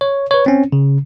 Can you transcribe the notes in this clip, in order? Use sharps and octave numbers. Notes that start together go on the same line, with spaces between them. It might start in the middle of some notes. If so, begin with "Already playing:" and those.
C#5
B4 C#5
C4 C#4
C#3